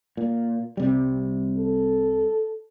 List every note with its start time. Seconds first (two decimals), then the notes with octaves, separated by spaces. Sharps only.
0.17 A#2
0.77 C2 C3 G3
1.58 A4